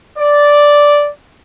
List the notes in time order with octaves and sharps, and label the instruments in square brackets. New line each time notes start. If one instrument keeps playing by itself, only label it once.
[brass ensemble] D5